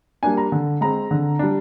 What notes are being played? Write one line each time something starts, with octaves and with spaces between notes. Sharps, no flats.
G3 A#3 D4 G#5
A#5
D3
G#3 C4 A#5
D3
G3 D4